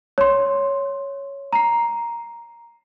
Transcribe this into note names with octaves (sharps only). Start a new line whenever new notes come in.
C#5 C6
A#5 C7